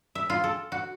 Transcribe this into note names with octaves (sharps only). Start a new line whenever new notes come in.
E5
F4
A4
F#4